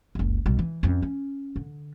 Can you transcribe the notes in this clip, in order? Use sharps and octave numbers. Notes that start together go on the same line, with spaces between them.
F#1 C#2
B1 G3
E3
F2 C#4
C#4
D3